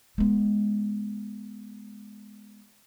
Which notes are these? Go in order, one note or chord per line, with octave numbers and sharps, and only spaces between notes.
G#3 B3